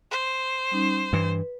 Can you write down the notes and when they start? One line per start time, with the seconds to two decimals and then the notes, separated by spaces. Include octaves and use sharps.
0.11 C5
0.71 G3 C#4 D#4
1.13 G2 E3 B4